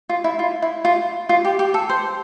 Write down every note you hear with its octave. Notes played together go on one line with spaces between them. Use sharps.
F4
E4
F4
E4
F4
F4
G4
G4
A4
C5